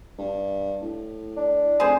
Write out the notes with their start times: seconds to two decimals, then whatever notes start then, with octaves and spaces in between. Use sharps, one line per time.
0.18 G2
0.82 A2
1.37 D4
1.80 F1 G#4 C5